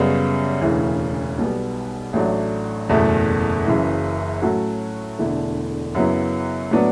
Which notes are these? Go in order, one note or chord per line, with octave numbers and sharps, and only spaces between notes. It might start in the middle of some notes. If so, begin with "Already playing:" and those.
Already playing: F#2 C#3 G3 B3
E1 D2 C#3 E3
B1 B2 G3 B3
A1 A2 F#3 A3 D4
F#1 E2 B2 A3
F#1 F#2 C#3 E3
A2 F#3 C#4 F#4 A4
E1 E2 D3 A3 E4
F#2 C#3 F#3 B3 E4
A2 F#3 B3 D4